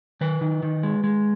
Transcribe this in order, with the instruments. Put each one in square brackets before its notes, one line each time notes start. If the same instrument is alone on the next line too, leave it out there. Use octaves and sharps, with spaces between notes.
[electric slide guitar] D#3 B4
D#3
D#3
G#3
G#3